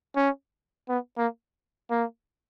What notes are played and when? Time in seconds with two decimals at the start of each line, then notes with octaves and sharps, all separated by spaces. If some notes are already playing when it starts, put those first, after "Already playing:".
0.16 C#4
0.89 B3
1.18 A#3
1.91 A#3